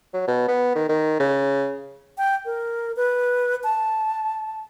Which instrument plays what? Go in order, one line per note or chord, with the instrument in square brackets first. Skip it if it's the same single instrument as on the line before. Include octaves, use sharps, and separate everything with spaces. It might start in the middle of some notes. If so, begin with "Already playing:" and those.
[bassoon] F#3
B2
B3
D#3
D#3
C#3
[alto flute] G5
A#4
B4
A5